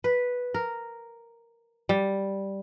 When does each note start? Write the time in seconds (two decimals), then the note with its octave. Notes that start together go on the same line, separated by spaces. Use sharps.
0.04 B4
0.54 A#4
1.89 G3